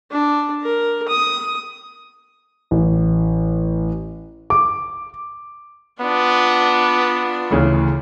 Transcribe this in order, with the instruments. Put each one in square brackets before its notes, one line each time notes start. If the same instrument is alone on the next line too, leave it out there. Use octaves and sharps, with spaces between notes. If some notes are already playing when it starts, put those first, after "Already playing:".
[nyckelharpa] D4
A#4
D#6
[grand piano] A1
D6
[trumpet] B3 [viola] D4 F4
[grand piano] D2 C#3 E3